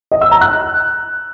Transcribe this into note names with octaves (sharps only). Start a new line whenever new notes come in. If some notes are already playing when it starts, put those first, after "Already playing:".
D#5
E6
A#5
F#6